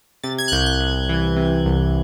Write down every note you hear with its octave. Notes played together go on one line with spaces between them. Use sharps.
C3 A6
G#6
F#6
C2 G6
F#6
C2
E3
C3
C2